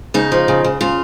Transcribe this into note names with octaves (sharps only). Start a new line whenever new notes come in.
C#3 D#4
F3
C#3
C#3
C#3 F4